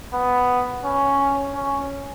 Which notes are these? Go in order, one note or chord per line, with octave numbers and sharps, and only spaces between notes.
B3
C#4
C#4